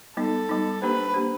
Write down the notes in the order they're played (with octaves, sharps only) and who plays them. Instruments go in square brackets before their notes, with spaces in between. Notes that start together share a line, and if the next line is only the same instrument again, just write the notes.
[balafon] G3 B3 D#4 [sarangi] A4
[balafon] G3 B3 D#4
[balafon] A#3 D4 G4 C5 [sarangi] B4
[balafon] A#3 D4 G4 C5